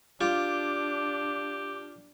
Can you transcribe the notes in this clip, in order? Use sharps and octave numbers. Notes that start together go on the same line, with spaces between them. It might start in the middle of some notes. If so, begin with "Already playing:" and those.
D4 F4 G4